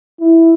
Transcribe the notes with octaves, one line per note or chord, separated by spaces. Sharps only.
E4